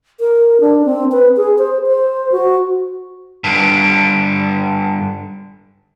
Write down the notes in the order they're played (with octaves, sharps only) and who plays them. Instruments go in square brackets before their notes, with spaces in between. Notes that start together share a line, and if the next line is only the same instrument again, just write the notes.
[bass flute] A#4
D4
C4
B4
G#4
C5
C5
F#4
[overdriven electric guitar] G2 D3